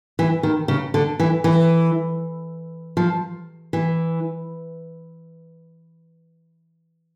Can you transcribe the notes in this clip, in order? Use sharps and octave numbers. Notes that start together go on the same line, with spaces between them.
E3
D#3
C#3
D3
E3
E3
F3
E3